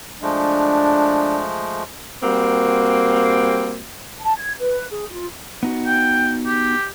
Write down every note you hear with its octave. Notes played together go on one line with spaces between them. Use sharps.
F3 G#3 A3 D4
G3 A#3 C4 F#4
A5
G#6
B4
G#4
F4
B3 D#4 F#4
G5
G4